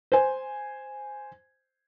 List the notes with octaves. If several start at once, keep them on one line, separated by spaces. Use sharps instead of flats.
C5 G#5